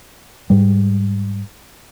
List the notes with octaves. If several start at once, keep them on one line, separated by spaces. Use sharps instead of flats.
G#2 G3